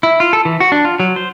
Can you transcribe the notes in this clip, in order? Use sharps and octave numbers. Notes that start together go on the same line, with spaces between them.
E4
F4
A4
E3
F#4
D4
F4
F#3
C5